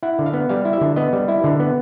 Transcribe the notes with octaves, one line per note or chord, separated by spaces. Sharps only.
E4 F#5
D3
F5
B3
G3 F5
E4
E5
D3
B3 D#5
G3
E4
D3
B3